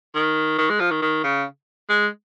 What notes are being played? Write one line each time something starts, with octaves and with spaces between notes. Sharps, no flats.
D#3
D#3
G#3
F3
D#3
D#3
C#3
G#3